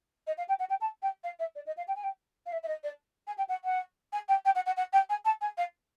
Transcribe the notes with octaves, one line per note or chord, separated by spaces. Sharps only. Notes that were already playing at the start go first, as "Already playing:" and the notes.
D#5
F5
G5
F#5
G5
A5
G5
F5
E5
D5
D#5
F5
G5
G#5
G5
F5
E5
E5
D#5
D5
G#5
G5
F#5
F#5
G#5
G5
G5
F#5
F#5
F#5
G5
G#5
A5
G#5
F5